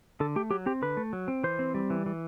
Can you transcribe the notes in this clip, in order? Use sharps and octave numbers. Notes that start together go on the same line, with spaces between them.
D3 A4
A3 G4
F#3 G4
C4 G4
D3 B4
A3
F#3
C4
E3 C5
C4
G3
E3
E3